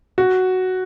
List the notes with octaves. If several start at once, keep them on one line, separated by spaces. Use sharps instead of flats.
F#4